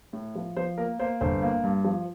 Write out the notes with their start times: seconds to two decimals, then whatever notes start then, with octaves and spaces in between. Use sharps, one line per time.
0.13 A2
0.35 F3
0.57 F3 C5
0.78 A#3 A#4
0.99 A#3 C5
1.21 G1 C5
1.42 A#3
1.63 G2
1.84 F3